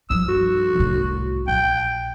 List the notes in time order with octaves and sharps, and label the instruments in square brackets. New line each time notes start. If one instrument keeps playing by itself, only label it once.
[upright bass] G2 F3 [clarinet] E6
[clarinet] F#4
[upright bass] C2 A2
[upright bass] A#1 [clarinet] G5